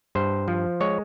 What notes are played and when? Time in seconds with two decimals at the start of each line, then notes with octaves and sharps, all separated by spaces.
0.15 G2 C5
0.48 F3
0.81 G#3 C#5